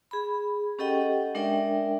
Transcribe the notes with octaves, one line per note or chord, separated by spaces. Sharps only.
G#4 B5
C#4 G4 A4 D#5 F#5 G5
G#3 D4 A#4 D5 E5 G5